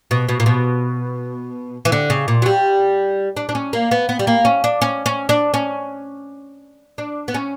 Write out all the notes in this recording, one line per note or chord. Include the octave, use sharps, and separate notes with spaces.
B2
B2
A#2
B2
E3
D3
C#3
A#2
F#3
G3
D4
D4
C#4
A#3
B3
B3
G3
A#3
C#4
D4
C#4
C#4
D4
C#4
D4
B3
C#4